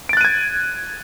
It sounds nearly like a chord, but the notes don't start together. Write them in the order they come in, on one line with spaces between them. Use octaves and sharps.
D7 A6 F#6 D#7 G#6